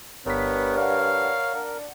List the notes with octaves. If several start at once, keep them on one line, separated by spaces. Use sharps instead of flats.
G1 G2 B3 A#4 C#5 B6
D5 F5 F#5
D4 A#4